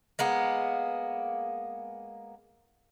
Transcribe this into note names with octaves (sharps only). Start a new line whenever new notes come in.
G#3 A#3 B3